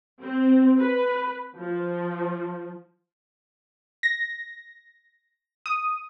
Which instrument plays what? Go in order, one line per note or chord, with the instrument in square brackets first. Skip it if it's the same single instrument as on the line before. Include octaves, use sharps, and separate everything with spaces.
[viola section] C4
B4
F3
[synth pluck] A#6
D#6